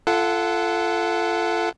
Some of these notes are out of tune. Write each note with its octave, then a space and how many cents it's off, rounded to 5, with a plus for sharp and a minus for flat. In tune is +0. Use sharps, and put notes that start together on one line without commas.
F4 -30 A4 +0 F#5 +0